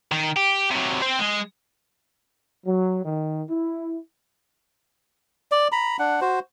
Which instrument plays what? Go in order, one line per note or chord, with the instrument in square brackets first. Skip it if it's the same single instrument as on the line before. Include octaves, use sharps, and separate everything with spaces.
[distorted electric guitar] D#3
G4
C3 F#3
C4 C5
G#3
[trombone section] F#3
D#3
E4
[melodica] D5
A#5 B5
D4 F#5
F#4 C5